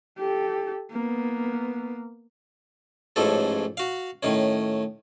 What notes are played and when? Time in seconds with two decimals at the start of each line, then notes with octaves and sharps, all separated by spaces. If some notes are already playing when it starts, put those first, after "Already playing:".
0.18 G4 A4
0.92 A#3 B3
3.16 A1 G#2 F3 C#4 A4
3.77 F#4 F5
4.23 A2 D#3 C#4